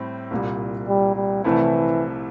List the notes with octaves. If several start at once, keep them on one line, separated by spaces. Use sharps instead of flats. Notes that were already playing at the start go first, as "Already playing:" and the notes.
Already playing: A2 G3 C4
C2 A#2 G3
G3
G3
C2 C3 E3 F3 A3 E4